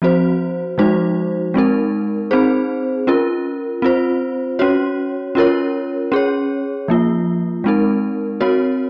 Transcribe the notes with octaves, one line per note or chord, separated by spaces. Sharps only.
F3 C4 F#4 C5
F3 G#3 D#4 F#4 C5
G#3 C4 D#4 A#4
C4 D#4 G#4 C5
C#4 F4 A#4
C4 F4 C5
C#4 F#4 C#5
C#4 F4 A#4 C#5
C#4 G#4 C#5
F3 A#3 F4
G#3 C4 D#4 A#4
C4 F#4 A#4 C#5